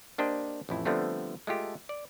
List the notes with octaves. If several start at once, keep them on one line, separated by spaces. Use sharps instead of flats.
A#3 D4 G4 C5 D#5
A1 F2 E4
D3 F3 G3 A3 B3 C4
G#3 A3 F4 G4 A4
D5